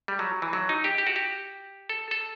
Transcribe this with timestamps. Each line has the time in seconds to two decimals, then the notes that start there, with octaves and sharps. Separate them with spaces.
0.08 G3
0.19 F#3
0.42 E3
0.53 F#3
0.69 D#4
0.84 G4
0.98 G4
1.07 F#4
1.16 G4
1.89 A4
2.11 A4